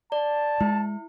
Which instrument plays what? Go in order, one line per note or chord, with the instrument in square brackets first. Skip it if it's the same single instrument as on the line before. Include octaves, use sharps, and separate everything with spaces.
[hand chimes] D5 [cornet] A5
[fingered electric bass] G#3 [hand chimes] E4